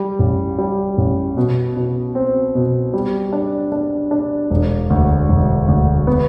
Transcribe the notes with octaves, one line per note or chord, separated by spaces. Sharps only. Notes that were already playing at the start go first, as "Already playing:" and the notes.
Already playing: G3
A1
G3
A1
B2
B2
C4
B2
G3
D4
D4
D4
E1
D2
E1
D2
B3